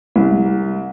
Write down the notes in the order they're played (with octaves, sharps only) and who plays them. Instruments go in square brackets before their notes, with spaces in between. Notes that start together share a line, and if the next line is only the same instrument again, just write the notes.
[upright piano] C2